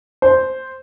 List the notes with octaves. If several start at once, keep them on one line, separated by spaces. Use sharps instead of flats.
C5